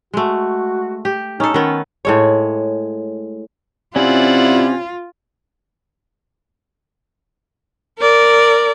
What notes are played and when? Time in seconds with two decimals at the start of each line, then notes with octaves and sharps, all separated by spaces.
0.14 G#3 A3 F#4
1.05 G4
1.40 C#4 D#4 A4
1.54 D#3 B3 C#4
2.05 A2 G#3 C#5
3.96 C3 C4 C#4 E4 F4 D5 F#5
7.98 A#4 D5